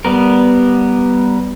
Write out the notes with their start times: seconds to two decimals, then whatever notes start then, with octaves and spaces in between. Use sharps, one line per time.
0.05 G3 B3 A#4